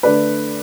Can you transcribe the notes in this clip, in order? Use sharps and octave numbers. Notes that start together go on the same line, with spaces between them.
D3 A3 D4 B4 D5